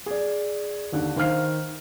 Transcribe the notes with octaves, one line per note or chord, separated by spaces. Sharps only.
G#4 D5
D#2 D3 F#6
D#3 C5 F5 F6 C7